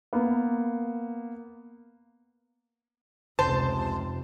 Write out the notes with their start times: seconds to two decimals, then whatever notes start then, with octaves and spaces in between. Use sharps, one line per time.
0.13 A#3 B3
3.39 F1 C#2 C3 C5 A5